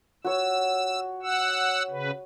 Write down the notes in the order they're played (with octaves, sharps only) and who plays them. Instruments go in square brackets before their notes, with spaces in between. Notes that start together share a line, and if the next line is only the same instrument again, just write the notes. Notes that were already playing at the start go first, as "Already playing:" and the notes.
[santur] F#4 C#5 [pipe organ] E6
[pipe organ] F#5 E6
C#3 B4